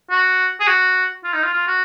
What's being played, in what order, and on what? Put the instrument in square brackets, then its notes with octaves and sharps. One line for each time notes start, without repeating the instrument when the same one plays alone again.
[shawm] F#4
G#4
F#4
F4
D#4
F4
F4
F#4